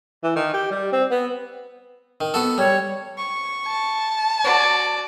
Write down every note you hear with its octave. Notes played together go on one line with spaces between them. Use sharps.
E3
D#3
G4
G3
C4
B3
D#3
B3 F#4 A4
G3 C#5
C#6
A5
F#4 D5